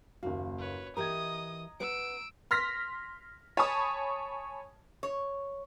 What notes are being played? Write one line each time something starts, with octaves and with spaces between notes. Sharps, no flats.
F#1 D#2 F#4 F5
B4 C#5
E3 G4 A#4 D#5 A#5 D#6 G#6
B4 F#5 E6 D7
C6 F6 A#6 B6
C#5 G#5 A5 B5 C#6 D#6
C#5